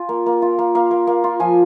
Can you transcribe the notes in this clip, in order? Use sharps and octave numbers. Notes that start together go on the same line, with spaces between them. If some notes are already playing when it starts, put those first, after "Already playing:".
Already playing: F4 G#5
A#3
A#3
F4
A#3
A#3 F5
A#3
A#3
F4
F3 G#5